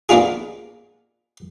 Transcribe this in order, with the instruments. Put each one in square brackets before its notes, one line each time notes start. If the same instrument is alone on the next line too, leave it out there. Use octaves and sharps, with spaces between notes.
[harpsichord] A#3 B3 D4 D#4 F4 G#4